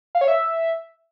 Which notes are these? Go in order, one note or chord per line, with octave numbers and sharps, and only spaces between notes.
F5
C#5
E5